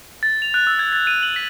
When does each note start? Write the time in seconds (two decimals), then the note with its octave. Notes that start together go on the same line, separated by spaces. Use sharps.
0.23 A6
0.42 F7
0.54 F#6
0.67 E6
0.79 G#6
0.93 A6
1.07 D#7
1.23 F#7
1.36 B6